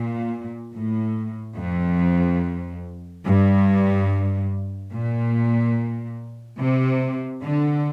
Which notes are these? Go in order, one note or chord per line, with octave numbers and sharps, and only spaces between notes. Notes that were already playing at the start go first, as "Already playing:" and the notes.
Already playing: A#2
A2
F2
G2
A#2
C3
D3